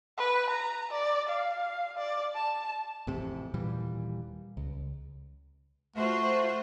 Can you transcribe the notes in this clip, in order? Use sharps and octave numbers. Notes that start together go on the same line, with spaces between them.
B4
A#5
D5
F5
D5
A5
A1 F2 C3
D#1 A#2 E3 G3
C#2
A3 F4 F#4 C5